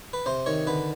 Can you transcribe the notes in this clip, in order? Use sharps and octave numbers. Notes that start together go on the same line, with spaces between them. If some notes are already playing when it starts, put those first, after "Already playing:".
B4
C3 C5
D#3 C#5
D3 B4